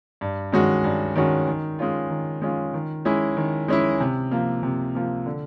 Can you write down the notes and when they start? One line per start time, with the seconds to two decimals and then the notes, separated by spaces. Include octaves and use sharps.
0.21 G2
0.52 D#3 G#3 C#4 F#4
0.84 G2
1.16 D#3 G#3 C#4 F#4
1.47 D#3
1.79 G#3 C#4 F4
2.10 D#3
2.42 G#3 C#4 F4
2.74 D#3
3.05 G#3 C#4 E4
3.37 D#3
3.68 G#3 C#4 E4
4.00 C3
4.31 F3 A#3
4.63 C3
4.95 F3 A#3
5.26 D3